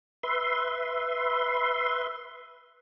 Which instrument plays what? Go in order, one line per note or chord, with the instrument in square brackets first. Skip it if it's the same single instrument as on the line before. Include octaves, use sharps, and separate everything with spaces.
[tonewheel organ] B4 E5 C6